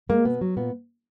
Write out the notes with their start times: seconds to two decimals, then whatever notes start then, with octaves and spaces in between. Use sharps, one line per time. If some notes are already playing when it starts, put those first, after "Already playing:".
0.09 G#3 A#3
0.25 B2 B3
0.41 F#3
0.56 A#2 B3